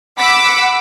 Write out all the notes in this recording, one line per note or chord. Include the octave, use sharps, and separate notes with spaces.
F#5 B5 D6 E6 B6